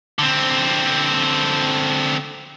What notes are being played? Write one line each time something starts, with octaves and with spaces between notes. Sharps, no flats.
D3 C4